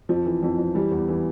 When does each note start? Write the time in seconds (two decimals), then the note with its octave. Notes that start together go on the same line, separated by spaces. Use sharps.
0.09 F2 F3
0.26 E3
0.43 F2
0.58 F2
0.75 E3 G3
0.91 E2
1.09 E3